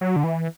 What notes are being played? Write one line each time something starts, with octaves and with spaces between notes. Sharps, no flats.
F#3
D3
E3